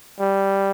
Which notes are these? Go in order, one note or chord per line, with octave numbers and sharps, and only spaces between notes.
G3